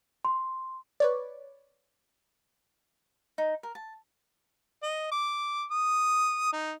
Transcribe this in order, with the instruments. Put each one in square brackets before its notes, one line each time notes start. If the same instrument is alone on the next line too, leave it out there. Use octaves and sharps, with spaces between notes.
[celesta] C6
[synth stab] B4 C#5 D5
[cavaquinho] D#4
A#4
A5
[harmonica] D#5
D6
D#6
D#4